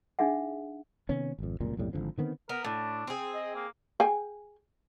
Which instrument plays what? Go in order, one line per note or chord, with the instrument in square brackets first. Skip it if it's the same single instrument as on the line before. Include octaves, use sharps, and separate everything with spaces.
[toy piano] D4 D#4 G#4 E5 F#5
[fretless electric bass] C3 D#3 B3 C#4
G#1 F2
F1 C#2 F#2 A#2
B1 F2 A2 G3
G#1 D2 D3 F3
D3 D#3 B3 C4
[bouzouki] B3 [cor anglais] A#4
[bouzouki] A2 [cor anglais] D4
[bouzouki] C4 G#4
[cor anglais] D#5
A#3
[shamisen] G#4 G5 G#5